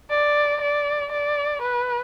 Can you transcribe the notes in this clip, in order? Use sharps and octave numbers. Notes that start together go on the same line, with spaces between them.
D5
D5
D5
B4